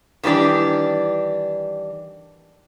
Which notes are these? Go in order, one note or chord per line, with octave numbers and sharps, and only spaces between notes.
D#3 E3 G3 D4 D5